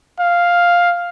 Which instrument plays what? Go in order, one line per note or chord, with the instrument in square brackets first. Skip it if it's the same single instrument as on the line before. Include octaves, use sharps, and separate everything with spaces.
[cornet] F5